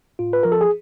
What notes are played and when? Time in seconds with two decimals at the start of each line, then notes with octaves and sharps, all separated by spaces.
0.19 A2 F4
0.33 B4
0.43 F3 A#4
0.52 A4
0.61 G#4